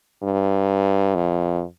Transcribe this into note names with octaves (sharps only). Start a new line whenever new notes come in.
G2
F2